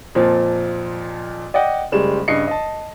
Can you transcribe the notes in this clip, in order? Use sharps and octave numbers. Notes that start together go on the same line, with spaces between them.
F2 A#2 F3
D5 D#5 F#5 G5
F#1 G3 G#3 E7
G2 C#3 D#5 C7 C#7
D#5 A5